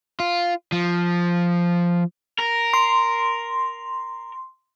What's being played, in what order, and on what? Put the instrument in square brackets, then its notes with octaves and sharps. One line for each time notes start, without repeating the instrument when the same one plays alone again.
[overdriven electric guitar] F4
F3
A#4
[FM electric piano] C6